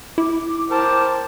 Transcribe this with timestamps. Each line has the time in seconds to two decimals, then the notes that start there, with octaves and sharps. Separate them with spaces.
0.18 E4 D6
0.71 A#4 C5 G5 A5 D6